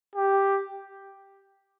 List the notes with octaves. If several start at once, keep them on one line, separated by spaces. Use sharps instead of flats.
G4